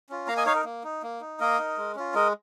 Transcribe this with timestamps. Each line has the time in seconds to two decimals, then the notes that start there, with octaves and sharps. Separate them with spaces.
0.09 C#4 F4
0.27 A#3 F5 A#5
0.37 D#5 G#5
0.46 D#4 C#5 F5
0.55 A#4
0.65 A#3
0.84 D#4
1.03 A#3
1.21 D#4
1.40 A#3 A#4 D#5
1.59 D#4
1.77 G#3
1.95 C#4 F4
2.14 G#3 A#4 D#5